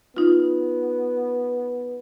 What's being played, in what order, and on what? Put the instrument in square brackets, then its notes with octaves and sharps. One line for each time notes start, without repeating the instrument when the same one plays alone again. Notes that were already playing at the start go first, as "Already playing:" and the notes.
[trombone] B3 [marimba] D#4 F4